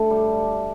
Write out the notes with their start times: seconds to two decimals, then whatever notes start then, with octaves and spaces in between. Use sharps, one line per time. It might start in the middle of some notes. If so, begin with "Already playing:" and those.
Already playing: D3 A3
0.10 G3